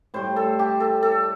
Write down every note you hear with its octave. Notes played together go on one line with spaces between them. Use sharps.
A2 G3 C5
A4
G4
A4
A4